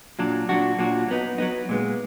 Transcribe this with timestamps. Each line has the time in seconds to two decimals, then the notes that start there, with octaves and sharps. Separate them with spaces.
0.19 A#2 F#3 D4
0.49 A#2 F#3 D4 F#4
0.79 A#2 F#3 D4 F#4
1.09 F#3 B3 D#4
1.38 F#3 B3 D#4
1.69 A#2 G#3 B3